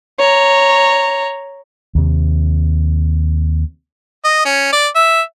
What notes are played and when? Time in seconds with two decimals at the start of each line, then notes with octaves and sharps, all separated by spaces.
0.19 C#5 A#5
1.95 D#2 C3
4.25 D#5
4.46 C#4
4.73 D5
4.95 E5